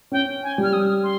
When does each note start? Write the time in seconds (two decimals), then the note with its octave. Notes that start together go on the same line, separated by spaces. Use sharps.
0.12 C#4 G5
0.43 G#5
0.58 G3
0.63 F6
0.73 D#6
1.03 C6